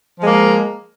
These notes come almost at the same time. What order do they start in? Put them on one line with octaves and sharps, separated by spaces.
F3 G#3 A#3